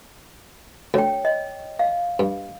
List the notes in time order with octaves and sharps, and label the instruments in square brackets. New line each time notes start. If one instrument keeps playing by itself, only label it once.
[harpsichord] D2 [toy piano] C#5 G5
[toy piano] D#5
D#5 F5
[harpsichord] G2